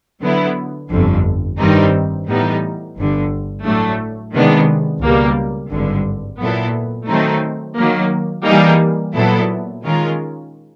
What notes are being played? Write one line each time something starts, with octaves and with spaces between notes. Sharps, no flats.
D3 F#3 B3 E4
G1 F2 D3
G2 D#3 G3 C4 D#4
A2 E3 G3 B3 D#4
G1 G2 D3
A2 F#3 A3 D4
C3 D#3 G#3 B3 D4
C#2 B2 G3 A#3
G#1 G2 D3
A#2 F#3 B3 E4 A4
D#3 F#3 A3 C4 D#4
D#3 F#3 A#3
E3 G3 A#3 D#4 G#4
A#2 F#3 B3 E4 A4
D#3 G#3 C#4 F4 A#4